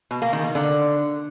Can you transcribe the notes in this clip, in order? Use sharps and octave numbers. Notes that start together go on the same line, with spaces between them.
B2
A#3
D#3
A#3
D3